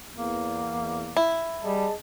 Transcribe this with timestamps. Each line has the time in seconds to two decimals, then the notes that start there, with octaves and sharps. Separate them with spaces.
0.16 E2 A#3
1.17 E4
1.63 G3 G#4 D#5 A5